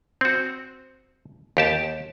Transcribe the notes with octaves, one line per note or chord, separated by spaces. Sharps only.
C4 F#4
D#2 G4 A5